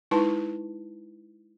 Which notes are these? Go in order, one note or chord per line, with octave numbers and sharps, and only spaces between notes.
G#3 D#4 E4 B4 A5 C6